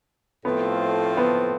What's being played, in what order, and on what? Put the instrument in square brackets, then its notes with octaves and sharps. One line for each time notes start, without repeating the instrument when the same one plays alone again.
[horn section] A2 F3 A3 C4 F4 [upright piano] B3
[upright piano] B3